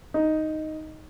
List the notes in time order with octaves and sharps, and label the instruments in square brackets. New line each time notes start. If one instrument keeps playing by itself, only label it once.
[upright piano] D#4